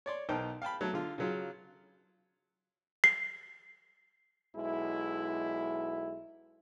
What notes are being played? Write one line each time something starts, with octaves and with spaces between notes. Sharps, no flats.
C#5 D5 C6
B1 D#4 A#4 C5 G5 A5
F5 G5 A5 B5
F#3 A3
D3 F4
C#3 F#3 F4
C7
B1 G#3 E4